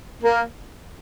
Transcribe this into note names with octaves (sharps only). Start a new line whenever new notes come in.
A#3